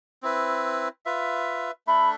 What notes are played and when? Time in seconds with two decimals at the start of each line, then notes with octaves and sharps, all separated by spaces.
0.23 C4 E4 B4
1.06 F4 B4 E5
1.87 A3 D4 A4 E5 B5